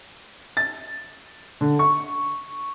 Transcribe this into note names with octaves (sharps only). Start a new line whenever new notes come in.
A6
D3
C#6